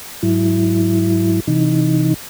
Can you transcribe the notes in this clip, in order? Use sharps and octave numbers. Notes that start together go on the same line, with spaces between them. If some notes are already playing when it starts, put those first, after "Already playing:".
G#2 F#3 E4
C3 E3 D#4